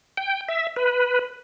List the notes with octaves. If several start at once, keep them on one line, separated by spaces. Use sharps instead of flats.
G5
E5
B4